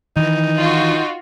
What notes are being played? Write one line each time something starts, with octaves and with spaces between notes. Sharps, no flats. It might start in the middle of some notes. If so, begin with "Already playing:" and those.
D#3 E3 D#4
F4 F#4